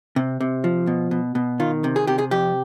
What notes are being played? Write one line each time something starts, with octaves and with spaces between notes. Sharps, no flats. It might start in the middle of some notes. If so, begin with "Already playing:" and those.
C3
C3
F3
B2
B2
B2
D#3 F4
C3
G#4
C3 G4
G#4
F2 G4